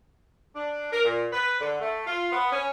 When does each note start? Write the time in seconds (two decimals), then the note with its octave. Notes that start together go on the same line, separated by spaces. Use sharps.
0.55 D4
0.93 A#4
1.05 A#2
1.33 B4
1.61 D3
1.81 A3
2.06 F4
2.32 B3
2.53 C#4